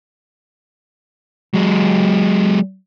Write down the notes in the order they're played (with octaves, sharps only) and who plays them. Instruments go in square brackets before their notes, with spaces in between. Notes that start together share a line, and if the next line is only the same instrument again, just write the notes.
[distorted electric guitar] F#3 G#3